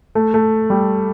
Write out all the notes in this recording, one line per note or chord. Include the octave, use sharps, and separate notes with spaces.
A3
A3
G3